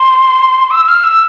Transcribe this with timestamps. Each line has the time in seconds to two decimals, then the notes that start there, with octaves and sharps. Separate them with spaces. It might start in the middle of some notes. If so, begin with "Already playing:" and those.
Already playing: C6
0.71 E6
0.88 F6
1.04 E6